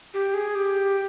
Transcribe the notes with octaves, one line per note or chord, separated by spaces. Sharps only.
G4
G#4
G4